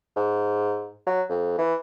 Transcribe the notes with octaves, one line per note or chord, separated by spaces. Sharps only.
G#2
F#3
F2
E3